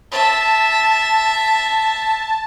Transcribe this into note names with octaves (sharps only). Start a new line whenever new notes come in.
E5 A5